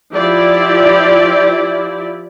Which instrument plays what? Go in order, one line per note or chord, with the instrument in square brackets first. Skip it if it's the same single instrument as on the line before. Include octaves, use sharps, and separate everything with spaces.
[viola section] F3 E4 G4 D5